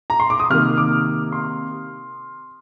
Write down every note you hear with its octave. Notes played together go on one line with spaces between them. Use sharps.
A#5
C6
D6
D#6
C3 D#3 A#3 F6
D6
C6